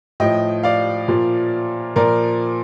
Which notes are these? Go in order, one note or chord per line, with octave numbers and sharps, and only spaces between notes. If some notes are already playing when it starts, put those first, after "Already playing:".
A2 F3 D#5 G5
D5 F5
A#2 F3
A#2 F3 A#4 D5